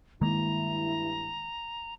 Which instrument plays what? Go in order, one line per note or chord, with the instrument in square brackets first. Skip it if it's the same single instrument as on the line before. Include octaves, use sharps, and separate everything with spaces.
[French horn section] G2 E4 [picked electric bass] D#3 G#3 A#3 [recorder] A#5